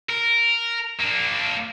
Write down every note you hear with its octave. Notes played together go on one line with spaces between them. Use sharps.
A#4
A#3 D4